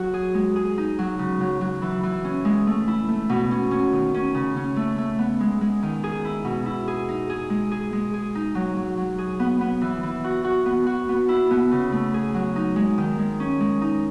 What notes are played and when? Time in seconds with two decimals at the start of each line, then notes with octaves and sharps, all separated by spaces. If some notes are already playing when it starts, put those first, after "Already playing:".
Already playing: F#3 F#4
0.14 G#4
0.34 G#3
0.56 G#4
0.78 D#4
0.99 F#3
1.19 C#3
1.41 F#3
1.61 F#3
1.82 E3
2.03 E3
2.24 C#4
2.45 G#3
2.67 A3
2.88 E4
3.08 A3
3.29 B2
3.51 C#4
3.71 C#4
3.93 D#3
4.14 C#4
4.35 C#3
4.56 C#4
4.76 A3
4.98 A3
5.19 B3
5.40 G#3
5.61 G#3
5.83 D#3
6.04 G#4
6.25 E4
6.45 B2
6.66 E4
6.88 G#4
7.09 D#4
7.30 G#4
7.50 G#3
7.71 G#4
7.93 G#3
8.13 G#4
8.35 D#4
8.55 F#3
8.76 F#3
8.97 F#3
9.18 G#4
9.40 B3
9.61 B3
9.81 E3
10.03 E3
10.24 F#4
10.44 F#4
10.65 B3
10.86 F#4
11.09 B3
11.29 E4
11.51 B3
11.71 C#3
11.92 A3
12.14 G#4
12.34 F#3
12.56 D#4
12.76 G#3
12.98 D#3
13.19 G#3
13.40 C#4
13.60 G#3
13.81 D#4